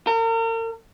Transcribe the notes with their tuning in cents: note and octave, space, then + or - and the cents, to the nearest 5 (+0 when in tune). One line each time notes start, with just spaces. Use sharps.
A#4 -40